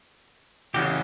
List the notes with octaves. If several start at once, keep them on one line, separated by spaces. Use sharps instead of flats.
C#3 E3 C#4 F#4 G4